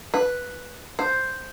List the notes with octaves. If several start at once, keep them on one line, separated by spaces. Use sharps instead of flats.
B4
C5